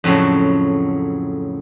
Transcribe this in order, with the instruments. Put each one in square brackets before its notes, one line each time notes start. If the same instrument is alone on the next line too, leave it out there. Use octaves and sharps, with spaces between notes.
[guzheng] F2 A2 C#3 F#3